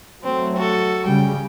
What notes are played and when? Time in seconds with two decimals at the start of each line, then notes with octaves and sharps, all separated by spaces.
0.24 F#3 A3 C4
0.57 F#4 A4
1.05 C#3 G3 G5